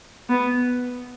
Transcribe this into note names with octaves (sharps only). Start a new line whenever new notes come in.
B3